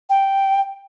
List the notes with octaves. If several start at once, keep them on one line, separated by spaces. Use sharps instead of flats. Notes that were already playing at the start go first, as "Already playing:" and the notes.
G5